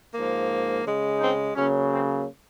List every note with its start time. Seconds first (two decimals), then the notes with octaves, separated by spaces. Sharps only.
0.14 G#2 F3 A#3
0.85 C#3 G#3
1.20 C4 D#4
1.55 C#3 F#3 A#3 C#4
1.90 C4